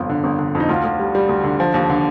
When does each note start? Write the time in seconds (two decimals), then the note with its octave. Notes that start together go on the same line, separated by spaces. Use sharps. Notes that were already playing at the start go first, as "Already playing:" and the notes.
Already playing: G1 F2 F4
0.09 D3
0.24 G1
0.39 D3
0.55 F2
0.60 D#4
0.69 D2 F4
0.84 D2
0.99 G3
1.15 G3
1.29 D2
1.44 D3
1.60 F3
1.74 D#2
1.90 D3